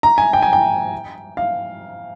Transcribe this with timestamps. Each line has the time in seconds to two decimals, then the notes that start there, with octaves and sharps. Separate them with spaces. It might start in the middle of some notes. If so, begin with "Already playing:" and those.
0.03 A#5
0.18 G#5
0.33 G5
0.42 G#5
0.53 G5
1.37 F5